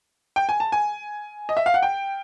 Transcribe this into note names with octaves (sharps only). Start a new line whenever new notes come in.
G5
G#5
A5
G#5
D#5
E5
F5
F#5
G5